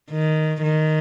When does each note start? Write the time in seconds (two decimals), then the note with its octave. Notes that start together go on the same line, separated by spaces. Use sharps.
0.11 D#3
0.63 D#3